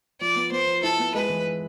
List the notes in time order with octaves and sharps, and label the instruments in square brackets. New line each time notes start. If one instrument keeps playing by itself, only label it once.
[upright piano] F3 [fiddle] D5
[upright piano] B3
[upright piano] B3 [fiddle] C5
[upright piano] F3
[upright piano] E4 [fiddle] A4
[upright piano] B3
[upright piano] G#3 [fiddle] B4
[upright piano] E3